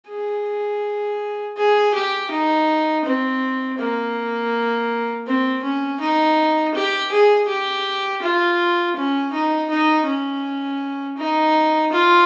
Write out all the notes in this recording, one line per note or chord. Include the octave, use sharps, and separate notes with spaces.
G#4
G#4
G4
D#4
C4
A#3
C4
C#4
D#4
G4
G#4
G4
F4
C#4
D#4
D#4
C#4
D#4
F4